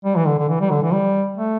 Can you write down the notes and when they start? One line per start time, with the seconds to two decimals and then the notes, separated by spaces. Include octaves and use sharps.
0.05 G3
0.16 E3
0.27 D3
0.38 D3
0.49 E3
0.60 G3
0.71 D3
0.82 E3
0.93 G3
1.37 A3